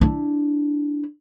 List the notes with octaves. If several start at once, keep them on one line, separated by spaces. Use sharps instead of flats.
D4 E4